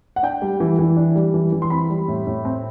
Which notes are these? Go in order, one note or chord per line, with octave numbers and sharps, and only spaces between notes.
F#5
D4 G5
G3
E3
E3
D4
G3
E3
E3
C6
C4 B5
G3
A2
A2
C4